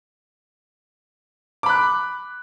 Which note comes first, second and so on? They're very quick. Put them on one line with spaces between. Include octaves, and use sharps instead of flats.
D6 B5 F#6